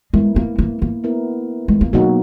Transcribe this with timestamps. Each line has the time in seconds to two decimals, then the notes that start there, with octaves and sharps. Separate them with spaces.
0.13 G#3 B3 E4 A#4
0.36 A#3
0.58 A#3
0.82 A#3
1.04 B3 E4 A#4
1.68 G#3
1.81 A#3
1.93 B2 F#3 A#3 B3 D#4 F#4